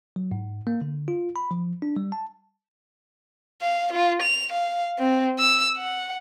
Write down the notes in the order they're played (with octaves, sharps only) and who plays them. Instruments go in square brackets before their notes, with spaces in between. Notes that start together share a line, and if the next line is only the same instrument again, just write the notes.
[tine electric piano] F#3
G#2
A#3
D3
F4
B5
F3
D4
G3
A5
[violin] F5
F4
F7
F5
C4
E6
F#5